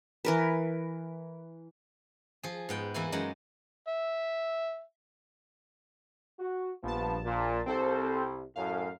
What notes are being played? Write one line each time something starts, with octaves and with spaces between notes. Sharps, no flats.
E3 A#4 B4
F3 G#4
G#2 B3 G5
E2 E3 A#3 E4 G#5
F#2 G#3 D#4 F#5
E5
F#4
A#1 G2 F3 B3 A5
A#2
C2 C4 A4 C5
F#2 A2 F5